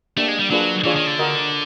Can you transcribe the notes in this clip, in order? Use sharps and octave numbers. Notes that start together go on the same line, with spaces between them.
A3 A#3 D4 G4
G#3
G3
F#3 A#3 D4 F4 G#4 B4
E3 D4 F4 G#4 C#5
D#3
D3
F#4 A#4 D#5